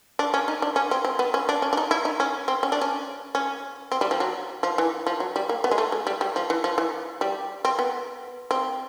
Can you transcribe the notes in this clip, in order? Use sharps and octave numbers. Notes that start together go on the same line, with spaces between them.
D4
C#4
D#4
D4
C#4
C4
C4
B3
C#4
D4
C#4
D4
D#4
E4
D#4
C#4
C4
C#4
D4
C#4
C#4
C4
G3
F3
F#3
F3
E3
F3
F#3
G3
A#3
B3
G#3
A3
G#3
G3
G3
F3
E3
F3
E3
G3
C4
B3
C4